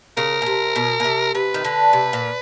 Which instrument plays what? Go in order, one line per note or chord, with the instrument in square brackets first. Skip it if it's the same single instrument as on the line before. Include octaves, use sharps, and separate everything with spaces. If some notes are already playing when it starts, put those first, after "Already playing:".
[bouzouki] C#3 [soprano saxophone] A#4
[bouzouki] B2
C3
B2
B2
C3
[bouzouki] C3 [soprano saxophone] B4
[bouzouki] D#3
D3
C3
A#2